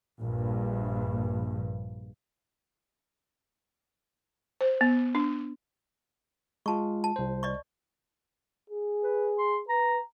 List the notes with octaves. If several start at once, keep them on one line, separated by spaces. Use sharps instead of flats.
A#1 G2
C5
B3
D4
G#3 F4 A5 C#6
A5
C2 C5
D5 D#5 C#6
G#4
B4
C6
B4 A#5